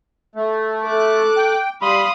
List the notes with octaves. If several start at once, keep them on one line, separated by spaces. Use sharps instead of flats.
A3
A4 D6 F#6
G5
G3 F5 B5 C6 D#6